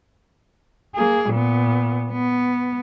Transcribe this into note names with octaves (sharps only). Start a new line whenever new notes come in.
A#3 G#4
A#2 B3
B3